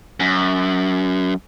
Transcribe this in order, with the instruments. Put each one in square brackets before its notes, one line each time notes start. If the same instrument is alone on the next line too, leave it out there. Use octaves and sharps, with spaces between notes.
[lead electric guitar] F#2